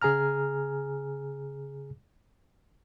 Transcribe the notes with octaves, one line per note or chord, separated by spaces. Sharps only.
C#3 G#4 G#5 A#5 F6